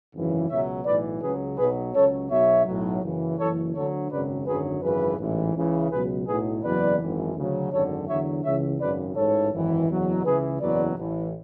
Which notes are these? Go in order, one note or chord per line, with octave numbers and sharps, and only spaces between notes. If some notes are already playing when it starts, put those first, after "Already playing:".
G#1 F#2 C#3 E3
C#2 B2 F#3 C#5 E5
B1 A2 E3 B4 D5
C#2 C#3 F#3 G#4 B4
B1 B2 F#3 G#4 B4
C#2 C#3 F#3 A4 C#5
B1 B2 F#3 C#5 E5
B1 A2 F#3
F#1 F#2 C#3 E3
F#1 F#2 E3 A4 C#5
D2 D3 F#3 A4 C#5
G#1 F#2 C#3 F#3 B4 D5
G#1 F#2 D3 F#3 G#4 B4
G#1 F#2 C#3 E3 G#4 B4
A1 G#2 E3
C#2 C#3 E3
C#2 B2 F#3 G#4 B4
B1 A2 F#3 G#4 B4
F#1 E2 B2 F#3 B4 D5
G#1 F#2 E3
D2 C#3 F#3
G#1 F#2 D3 A4 C#5
E2 D3 F#3 C#5 E5
C#2 C#3 E3 C#5 E5
G#1 F#2 C#3 B4 D5
A1 G#2 E3 A4 C#5
G#1 F#2 E3
F#1 E2 B2 F#3
C#2 C#3 E3 G#4 B4
F#1 E2 B2 F#3 B4 D5
A1 A2 E3